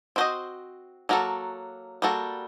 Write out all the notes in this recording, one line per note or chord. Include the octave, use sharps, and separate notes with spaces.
C4 F#4 C5 D#5
F#3 A#3 F#4 A4
G3 A#3 F#4 A4